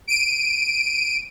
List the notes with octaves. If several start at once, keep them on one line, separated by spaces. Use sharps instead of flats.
D7 D#7